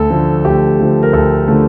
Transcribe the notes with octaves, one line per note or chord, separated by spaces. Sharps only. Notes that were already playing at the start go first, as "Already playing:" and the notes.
Already playing: D2 A4
D3 F3 A3
D2 G4
D3 F3 A3
A#4
D2 A4
D3 F3 A3